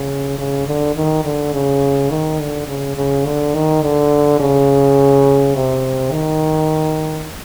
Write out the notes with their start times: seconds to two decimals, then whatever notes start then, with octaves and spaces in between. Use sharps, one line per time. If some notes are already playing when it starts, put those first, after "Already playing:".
Already playing: C#3
0.39 C#3
0.67 D3
0.96 D#3
1.25 D3
1.53 C#3
2.10 D#3
2.40 D3
2.68 C#3
2.97 C#3
3.25 D3
3.54 D#3
3.82 D3
4.40 C#3
5.55 C3
6.12 D#3